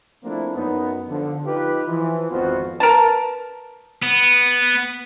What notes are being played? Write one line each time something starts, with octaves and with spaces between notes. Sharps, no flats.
F3 A3 A#3 C4 D4 E4
F#2 B3 D#4
D3 F3
D#4 F4 G4 B4
E3 F3
G#1 F2 B3 F4 F#4 C5
A#4 B4 A5
B3